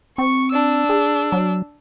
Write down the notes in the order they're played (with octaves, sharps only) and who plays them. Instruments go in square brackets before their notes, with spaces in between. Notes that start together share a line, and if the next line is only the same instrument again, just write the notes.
[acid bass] C4 [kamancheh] C#6
[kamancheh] D4 E6
[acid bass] G#4
F#3